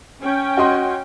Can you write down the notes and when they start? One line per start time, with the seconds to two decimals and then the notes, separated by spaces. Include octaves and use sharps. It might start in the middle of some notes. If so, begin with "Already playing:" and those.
0.21 C#4 G5
0.57 F#4 D#5 C6